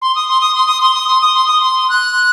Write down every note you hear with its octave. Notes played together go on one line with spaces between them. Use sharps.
C6
D#6
C6
D#6
C6
D#6
C6
D#6
C6
D#6
C6
D#6
C6
F#6